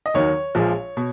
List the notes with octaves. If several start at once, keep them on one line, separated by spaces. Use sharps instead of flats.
D#5
D#2 D#3 F#3 C#5
A#1 A#2 F3 G#3
B2